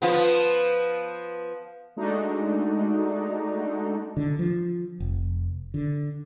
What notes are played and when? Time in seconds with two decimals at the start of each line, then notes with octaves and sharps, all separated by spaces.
0.02 F3 B3
1.97 G#3 A3 D4 D#4 F#4
4.17 D3
4.39 F3
5.00 F1
5.74 D3